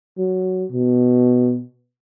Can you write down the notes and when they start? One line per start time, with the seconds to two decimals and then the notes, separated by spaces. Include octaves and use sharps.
0.18 F#3
0.71 B2